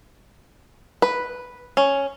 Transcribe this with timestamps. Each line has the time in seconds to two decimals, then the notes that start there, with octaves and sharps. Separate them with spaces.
1.02 B4
1.77 C#4